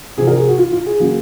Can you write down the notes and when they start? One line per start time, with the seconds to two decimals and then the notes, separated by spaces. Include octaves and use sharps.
0.18 C3 F3 C4 G#4
0.27 A#4
0.37 G#4
0.48 F#4
0.58 F4
0.72 F4
0.86 G#4
1.00 C#3 F#3 A#3